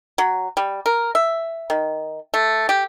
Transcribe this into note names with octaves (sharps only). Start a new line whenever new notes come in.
F#3
G3
A#4
E5
D#3
A3
G4